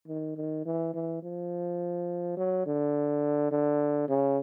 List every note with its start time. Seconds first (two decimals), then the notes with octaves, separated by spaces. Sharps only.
0.08 D#3
0.37 D#3
0.66 E3
0.94 E3
1.23 F3
2.37 F#3
2.66 D3
3.52 D3
4.08 C#3